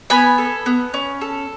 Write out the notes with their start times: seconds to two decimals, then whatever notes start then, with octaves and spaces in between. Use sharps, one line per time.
0.10 B3 G#5 B5
0.38 A4
0.66 B3
0.94 C#4
1.21 A4